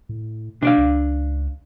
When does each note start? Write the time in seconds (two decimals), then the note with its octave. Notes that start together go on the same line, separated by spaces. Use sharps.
0.09 A2
0.62 B2 D4 D5 F5
0.78 C#2